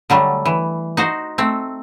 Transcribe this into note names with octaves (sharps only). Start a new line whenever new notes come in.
D3 F#3 G3 A3
E3
D#4 F#4 C5
A3 C4